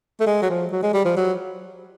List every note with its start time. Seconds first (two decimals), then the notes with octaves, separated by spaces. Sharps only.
0.20 A3
0.26 G#3
0.42 F#3
0.50 F3
0.72 F#3
0.83 G#3
0.93 G3
1.05 F3
1.17 F#3